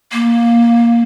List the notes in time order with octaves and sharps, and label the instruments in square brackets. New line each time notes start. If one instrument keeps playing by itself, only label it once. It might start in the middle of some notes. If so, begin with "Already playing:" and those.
[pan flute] A#3